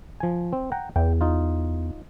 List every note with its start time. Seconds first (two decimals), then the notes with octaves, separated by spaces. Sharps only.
0.20 F3 G#5
0.53 C4
0.72 F#5 G5 A#5
0.96 E2 G5
1.21 D#4 F4